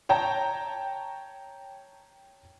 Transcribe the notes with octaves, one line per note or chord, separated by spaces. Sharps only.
C#5 G5 A5 A#5